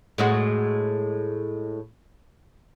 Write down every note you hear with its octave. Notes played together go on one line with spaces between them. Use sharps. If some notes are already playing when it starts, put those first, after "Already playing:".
A2 G#3 F#4